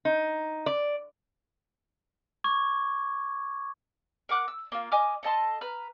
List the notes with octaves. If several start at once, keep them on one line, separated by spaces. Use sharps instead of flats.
D#4
D5
C#6 D6 G#6
A#4 F#5 D6 F#6
E6
A#3 F4
D#5 G#5 D6 F6
A4 D#5 A5 C6
B4 A#5 F6